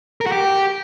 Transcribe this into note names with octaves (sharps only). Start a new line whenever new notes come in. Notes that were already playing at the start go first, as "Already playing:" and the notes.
A#4
F#4
G4